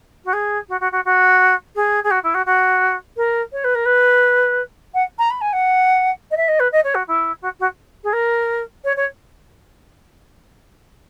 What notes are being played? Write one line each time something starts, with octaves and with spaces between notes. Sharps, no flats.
F#4
G#4
F#4
F#4
F#4
F#4
G#4
G#4
F#4
E4
F#4
F#4
A#4
C#5
B4
A#4
B4
F#5
A#5
B5
G#5
F#5
D#5
E5
D#5
B4
D#5
C#5
F#4
E4
F#4
F#4
G#4
A#4
C#5
C#5